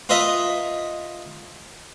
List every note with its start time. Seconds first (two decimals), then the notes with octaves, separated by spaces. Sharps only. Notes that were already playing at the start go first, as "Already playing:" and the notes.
0.09 F4 B4 D#5 E5 A#5